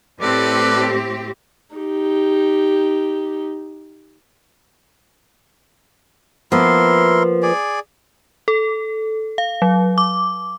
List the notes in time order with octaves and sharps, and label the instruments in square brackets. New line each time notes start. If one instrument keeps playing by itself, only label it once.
[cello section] A2 C4 G4 [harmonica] A4 B4 D5
[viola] D#4 G4
[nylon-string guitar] F3 A#3 B3 [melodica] E4 A#4 C6
[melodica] G#4 D5
[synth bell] A4
F5
F#3
D6